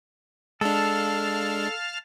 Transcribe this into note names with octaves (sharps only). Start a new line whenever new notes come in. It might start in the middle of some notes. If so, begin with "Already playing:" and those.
G#3 D4 A4 F5 A5 F6